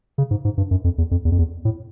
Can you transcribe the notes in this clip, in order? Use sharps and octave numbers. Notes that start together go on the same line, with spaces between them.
C#3
G#2
G#2
G2
F#2
F2
E2
F2
E2
F2
E2
A2